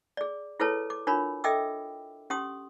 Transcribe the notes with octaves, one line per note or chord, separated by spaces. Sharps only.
G#4 D5
E4 G#4 A4 B4 C#5 A5
D6
D4 F4 A#4 C#5 B5
A4 D#5 E5 G5 D6 E6
C#4 G4 C6 D#6